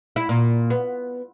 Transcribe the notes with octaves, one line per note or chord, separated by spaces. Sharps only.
E4
A#2
B3